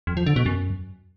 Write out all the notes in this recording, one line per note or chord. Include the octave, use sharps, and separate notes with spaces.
F2
F3
D3
B2
F#2